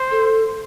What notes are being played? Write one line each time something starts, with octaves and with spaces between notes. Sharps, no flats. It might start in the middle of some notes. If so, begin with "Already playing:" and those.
Already playing: C5
A4